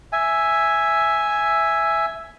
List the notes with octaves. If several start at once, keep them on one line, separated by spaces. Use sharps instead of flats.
E5 G#5